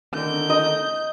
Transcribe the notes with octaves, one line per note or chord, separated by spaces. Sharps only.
D3 D#3 G6
D#5